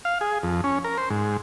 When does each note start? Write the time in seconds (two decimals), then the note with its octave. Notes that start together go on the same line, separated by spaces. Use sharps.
0.05 F5
0.21 G#4
0.43 F2
0.64 C#4
0.84 A#4
0.98 C5
1.10 G#2